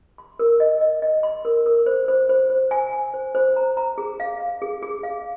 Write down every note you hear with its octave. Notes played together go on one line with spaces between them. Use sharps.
C6
A#4
D#5
D#5
D#5
C6
A#4
A#4
C5
C5
C5
C5
G#5
G#5
C5
C5
A#5
A#5
G#4
F5
F5
G#4
G#4
F5